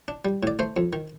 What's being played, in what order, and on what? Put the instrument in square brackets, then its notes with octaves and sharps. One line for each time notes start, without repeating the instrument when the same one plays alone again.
[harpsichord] D4
G3
A2 D5
A3 C5
F2
D#3